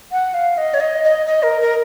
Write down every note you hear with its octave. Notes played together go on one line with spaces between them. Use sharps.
F#5
F5
D#5
C#5
D#5
D#5
D#5
A#4
A#4